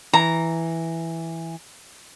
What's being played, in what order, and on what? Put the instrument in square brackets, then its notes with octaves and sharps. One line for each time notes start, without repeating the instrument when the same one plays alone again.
[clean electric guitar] E3 [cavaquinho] A#5